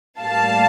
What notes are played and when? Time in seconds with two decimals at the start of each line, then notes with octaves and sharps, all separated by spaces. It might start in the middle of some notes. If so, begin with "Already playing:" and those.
0.20 A2 G3 A#3 F5 A5